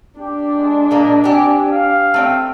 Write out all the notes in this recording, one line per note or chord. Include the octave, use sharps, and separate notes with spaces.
D4 G4
G#3
A#2 G#3 A#3 D#5
C4 G4 G#5
F5
A3 C4 G5